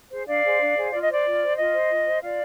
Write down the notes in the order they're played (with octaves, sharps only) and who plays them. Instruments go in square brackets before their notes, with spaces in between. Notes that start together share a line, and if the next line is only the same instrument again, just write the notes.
[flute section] G#4 C5
D4 D5 F5
G#4 C5
D4
G#4 C5
F4 D5
D#5
C5 D5
F4
C5
F4 D#5
C5
F4
C5
F4 D5 F5